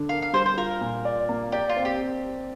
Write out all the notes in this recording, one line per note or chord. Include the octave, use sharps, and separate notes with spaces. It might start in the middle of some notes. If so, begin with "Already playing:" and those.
Already playing: D3 D4
A#4 F5
F5
G3 C5
C5
F4 A#4
A#2
D5
A#3
G4 D5
F4
C4
G4